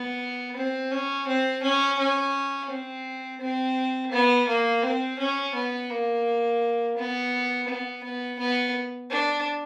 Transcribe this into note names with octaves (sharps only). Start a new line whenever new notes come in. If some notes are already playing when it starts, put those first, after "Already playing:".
Already playing: B3
C4
C#4
C4
C#4
C#4
C4
C4
B3
A#3
C4
C#4
B3
A#3
B3
B3
B3
B3
D4